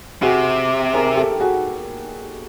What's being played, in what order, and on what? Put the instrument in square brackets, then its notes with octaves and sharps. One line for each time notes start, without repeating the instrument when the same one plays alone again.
[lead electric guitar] C3 [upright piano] F#4 G#4
[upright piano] G#4 A#4
G4 A4
F#4 G#4